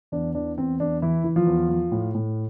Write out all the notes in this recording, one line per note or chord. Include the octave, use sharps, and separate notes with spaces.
E2 D4
E3 D4
E2 C4
E2 D4
E3 E4
E3
F3 F4
E2
F3
A2
A2